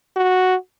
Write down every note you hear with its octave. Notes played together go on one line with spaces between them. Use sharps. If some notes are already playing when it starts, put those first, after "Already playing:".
F#4